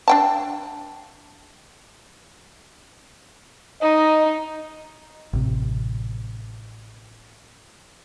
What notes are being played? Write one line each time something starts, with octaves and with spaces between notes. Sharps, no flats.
D4 G5 A5
D#4 D#5
A1 C3